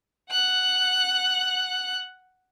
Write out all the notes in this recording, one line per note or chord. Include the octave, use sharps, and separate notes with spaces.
F#5 F#6